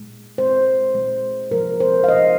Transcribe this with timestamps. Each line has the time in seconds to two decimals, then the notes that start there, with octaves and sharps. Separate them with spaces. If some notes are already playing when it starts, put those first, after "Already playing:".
Already playing: A#2 G#3
0.38 A#2 G#3 C5
0.95 A#2 G#3
1.51 C3 F3 G#3 A#4
1.80 C5
2.04 F5
2.09 C3 F3 G#3 D#5